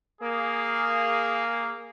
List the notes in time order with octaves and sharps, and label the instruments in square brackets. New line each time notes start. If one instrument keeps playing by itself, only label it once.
[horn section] A#3 G#4